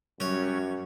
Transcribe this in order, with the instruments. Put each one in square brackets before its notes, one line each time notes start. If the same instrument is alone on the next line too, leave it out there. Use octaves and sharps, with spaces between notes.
[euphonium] F#2 [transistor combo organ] F#3 G3 C#4 [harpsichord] C#5